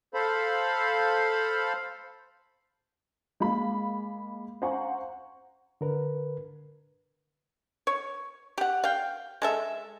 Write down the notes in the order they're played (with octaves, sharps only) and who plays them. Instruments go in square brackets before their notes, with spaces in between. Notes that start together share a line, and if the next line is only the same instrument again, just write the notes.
[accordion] A4 C5 F5 B5
[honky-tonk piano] G#3 A#3 F5 B5
C5 F5 F#5 G#5 A#5 C#6
[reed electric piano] D3 A#4 B4
[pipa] C#5
G4 F#5
F5 G5
G#3 A4 E5